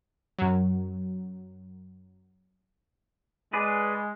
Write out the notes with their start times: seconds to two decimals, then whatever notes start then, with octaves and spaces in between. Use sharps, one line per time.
0.39 F#2 F#3
3.53 G#3 G#4 B4 D5